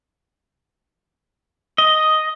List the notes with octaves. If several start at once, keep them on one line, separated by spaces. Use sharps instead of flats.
D#5